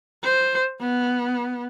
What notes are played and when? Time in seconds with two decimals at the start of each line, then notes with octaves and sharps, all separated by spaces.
0.23 C5
0.80 B3